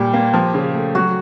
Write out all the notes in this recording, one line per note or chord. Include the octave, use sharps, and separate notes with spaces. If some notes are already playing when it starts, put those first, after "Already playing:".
Already playing: A#2 G3 G4
A#3
F3
C#3
A3
F#3 F#4